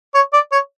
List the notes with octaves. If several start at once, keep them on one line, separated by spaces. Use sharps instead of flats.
C#5
D5
C#5